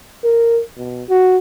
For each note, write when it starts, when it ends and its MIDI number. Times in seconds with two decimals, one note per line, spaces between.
0.24 0.62 70
0.77 1.03 47
1.09 1.38 66